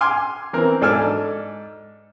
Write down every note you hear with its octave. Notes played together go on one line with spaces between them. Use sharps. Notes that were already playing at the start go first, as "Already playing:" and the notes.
G#5 C6 D6 F6
E3 C4 A#4
G#2 D4 A4 G#5 F6